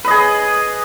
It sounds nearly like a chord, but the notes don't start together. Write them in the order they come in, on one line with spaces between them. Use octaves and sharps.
B4 D#5 G#4